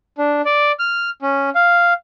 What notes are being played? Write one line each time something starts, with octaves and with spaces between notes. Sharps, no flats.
D4
D5
F6
C#4
F5